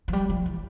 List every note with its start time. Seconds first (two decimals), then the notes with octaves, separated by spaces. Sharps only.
0.08 F3
0.13 G3
0.29 F3
0.46 E3